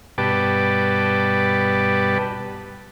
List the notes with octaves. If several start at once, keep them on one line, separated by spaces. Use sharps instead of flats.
G2 B2 G4 B4 A5 D6